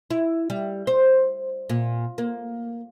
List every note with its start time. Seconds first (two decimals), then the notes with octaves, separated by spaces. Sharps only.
0.11 E4
0.50 G3
0.87 C5
1.69 A#2
2.18 A#3